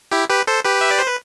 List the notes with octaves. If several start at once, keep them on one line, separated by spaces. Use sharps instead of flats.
E4 G4
G4 B4
A4 C5
G4 B4
E5
D5
C5
B4